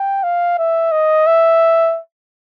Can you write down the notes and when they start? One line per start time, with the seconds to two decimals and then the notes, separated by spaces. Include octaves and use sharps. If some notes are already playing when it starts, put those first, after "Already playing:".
Already playing: G5
0.24 F5
0.58 E5
0.92 D#5
1.27 E5